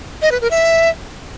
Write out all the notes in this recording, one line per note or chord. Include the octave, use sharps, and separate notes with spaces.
D#5
B4
A#4
E5